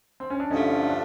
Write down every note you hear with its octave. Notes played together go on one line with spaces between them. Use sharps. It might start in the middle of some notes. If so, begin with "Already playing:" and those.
C4
C#4
D4
G2 D3 F3 A3 C#4 D#4
D4